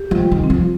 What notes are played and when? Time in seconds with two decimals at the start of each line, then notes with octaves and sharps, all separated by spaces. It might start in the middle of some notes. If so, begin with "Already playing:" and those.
Already playing: G4
0.11 F3
0.17 G3
0.32 D#3
0.44 C4
0.50 F3